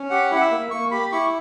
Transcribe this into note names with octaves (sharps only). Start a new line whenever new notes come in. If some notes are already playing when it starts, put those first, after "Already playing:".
Already playing: C#4
G4 F#5
E4 F#5
E5
A#3
A#3 C#6
G4 B5
E4 C#6